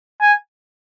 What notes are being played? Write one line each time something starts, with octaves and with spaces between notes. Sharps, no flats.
G#5